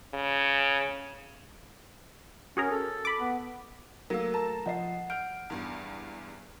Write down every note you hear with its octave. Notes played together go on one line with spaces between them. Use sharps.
C#3
C#4 F#4 G#4 A#4
A4
B5 D6
B3
F#3 A3 A#3 A#4 E6
A5 A#5
F3 D#5 F#5 C7
F#5 F6 G6 D7
E2 G2